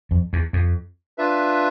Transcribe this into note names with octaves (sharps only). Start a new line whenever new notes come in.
F2
E2
F2
D4 F4 B4 E5